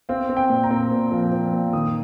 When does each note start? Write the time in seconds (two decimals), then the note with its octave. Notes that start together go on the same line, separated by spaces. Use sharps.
0.09 C4 F5
0.29 C4
0.37 G5
0.50 A#2
0.64 A#5
0.71 C4
0.91 A#2
1.12 F3
1.32 F3
1.53 A#2
1.73 D#3 D#6